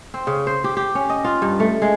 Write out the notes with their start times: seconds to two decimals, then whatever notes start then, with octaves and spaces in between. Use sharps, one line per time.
0.14 C4
0.27 C#3
0.47 C5
0.64 G4
0.77 G4
0.95 C#4
1.10 D#5
1.24 F4
1.42 G2
1.60 A3
1.82 G#3